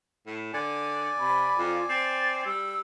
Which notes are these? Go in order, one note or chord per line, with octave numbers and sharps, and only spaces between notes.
A2
D3 D5 G#5
C3 B5
F2 F4
C4 A6
G3 E6